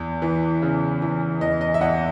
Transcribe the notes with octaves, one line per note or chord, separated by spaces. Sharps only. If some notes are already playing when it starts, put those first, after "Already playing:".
Already playing: E2
E3
C#3
E3
E2 D#5
D#5
E5
E2 D#5 F#5